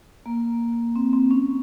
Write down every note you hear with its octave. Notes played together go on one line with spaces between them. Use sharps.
A#3
C4
C4
C#4